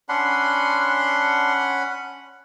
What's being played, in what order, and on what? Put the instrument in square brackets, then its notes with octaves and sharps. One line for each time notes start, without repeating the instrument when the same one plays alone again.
[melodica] C#4 F#5 B5 [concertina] D4 C6